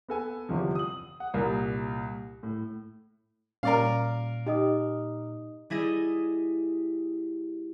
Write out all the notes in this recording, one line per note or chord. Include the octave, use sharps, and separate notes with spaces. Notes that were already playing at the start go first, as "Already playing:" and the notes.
B3 A4 G#5
G1 E2 C3 F3
D#6 F#7
F#5
C2 A#2 A#4
A2
A#2 G3 C#4 A#4 D5 F5
D#4 G4 D#5 D#6
G3 E4 G#4 D#5